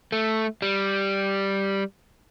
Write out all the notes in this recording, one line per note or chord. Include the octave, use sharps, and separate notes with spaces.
A3
G3